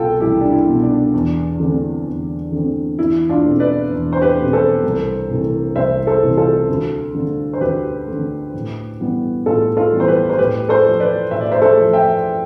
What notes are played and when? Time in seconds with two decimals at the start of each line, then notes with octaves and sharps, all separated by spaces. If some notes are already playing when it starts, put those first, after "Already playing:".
Already playing: C2 B2 B3 F4 A4 G5
0.20 C2 E4 G4
0.41 D4
0.52 E4
0.68 B2 B3
0.83 D4
1.14 E2
1.60 D3 A3 C4
2.06 E2
2.52 D3 A3 C4
2.98 E2 E4
3.29 D4 F4
3.45 B2 A3 C4
3.60 B4 D5
3.91 E2
4.13 C5
4.21 G4 B4
4.37 B2 A3 C4
4.53 A4 C5
4.84 C2
5.30 C3 E3 A3
5.76 C2 C5 E5
6.07 A4 C5
6.23 C3 E3 A3
6.37 F4 A4
6.69 D2
7.15 D3 A3
7.53 C5
7.61 D2 G4 B4
8.07 A3
8.12 D3
8.54 A2
9.00 E3 G3 B3
9.46 A2 F4 A4
9.77 F4 A4
9.93 E3 G3 B3
10.00 C5
10.07 G4 B4
10.30 C5
10.38 A2 G4 B4
10.69 A4 C5
10.84 F3 A3
11.00 B4 D5
11.31 A2 E5
11.41 D5
11.52 C5 E5
11.62 A4 C5
11.77 F3 A3
11.93 E5 G5